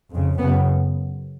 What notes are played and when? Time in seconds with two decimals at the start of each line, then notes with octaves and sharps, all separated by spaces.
0.10 F2 C#3
0.39 F#2 C#3 B3